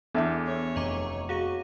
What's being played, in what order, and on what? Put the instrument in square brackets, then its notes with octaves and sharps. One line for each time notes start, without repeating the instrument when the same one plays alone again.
[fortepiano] E2 [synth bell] B3 D4 E4 [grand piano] A4 E5 D6
[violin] C#5
[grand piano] F1 [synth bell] D#5 A#5 D6
[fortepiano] F#4 [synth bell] G#4 F5 D#7